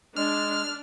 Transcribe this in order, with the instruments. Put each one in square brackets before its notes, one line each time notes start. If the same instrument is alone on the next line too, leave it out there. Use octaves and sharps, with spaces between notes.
[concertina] G#3 [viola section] D4 [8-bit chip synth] F6